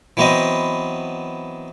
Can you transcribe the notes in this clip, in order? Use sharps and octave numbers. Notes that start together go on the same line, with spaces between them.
E3 F#3 B3 C4 D#5